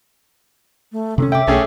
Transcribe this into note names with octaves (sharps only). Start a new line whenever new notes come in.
A3
C3 C4 C#4 A4
E5 G5 D6
B1 A3 C#4 G#4 G5